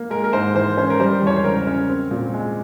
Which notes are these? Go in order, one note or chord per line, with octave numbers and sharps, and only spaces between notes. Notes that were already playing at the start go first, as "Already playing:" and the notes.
Already playing: A#3
G#3 A#4
A#4
G#2 C5
E3 C5
C#4 C5
A#4
G3 C5
E2
C#5
C5
C#3 A#4
C#4
C4
A#2
G#3